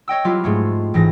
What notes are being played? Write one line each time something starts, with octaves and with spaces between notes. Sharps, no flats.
C#5 D#5 G5 E6
F#3 G3 C4 E4 F4
G#2 G#3 A3
A1 G#2 E3 A#6